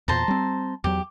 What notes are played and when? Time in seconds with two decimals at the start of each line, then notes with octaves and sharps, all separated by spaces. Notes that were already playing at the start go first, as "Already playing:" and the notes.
0.08 E2 A#2 C5 A5 A#5
0.28 G3 C4
0.84 E2 F#3 G4